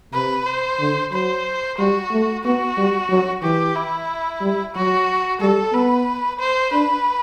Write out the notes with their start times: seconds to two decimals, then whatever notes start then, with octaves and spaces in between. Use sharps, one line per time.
0.13 C3 B4
0.46 C5
0.80 D3
1.12 F#3 C5
1.78 G3 F#4
2.11 A3
2.44 B3 F#4
2.77 G3
3.10 F#3
3.42 E3 G4
3.76 E4
4.41 G3
4.75 F#3 F#4
5.41 G3 A4
5.73 B3 B4
6.39 C5
6.72 D4 B4